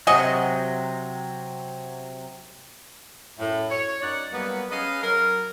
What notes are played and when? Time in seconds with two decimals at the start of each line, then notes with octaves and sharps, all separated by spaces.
0.07 C3 F#3 F#4 G#4 D#5
3.38 F#2 A2
3.69 C#5
4.01 F#2 D#4 D5 F#5
4.33 F#3 G3 A#3 B3
4.70 C#4 G#4 B4 D#5 F5
5.02 F#3 A#4